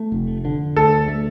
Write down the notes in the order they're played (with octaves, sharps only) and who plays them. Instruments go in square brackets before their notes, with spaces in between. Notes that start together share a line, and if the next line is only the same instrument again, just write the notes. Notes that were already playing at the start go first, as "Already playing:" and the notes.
Already playing: [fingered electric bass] A3
F1
D3
[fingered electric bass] D2 [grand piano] A4
[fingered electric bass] A3